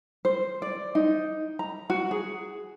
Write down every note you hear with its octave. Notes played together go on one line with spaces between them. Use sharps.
C5
D5
D#4
A#5
F#4
G#4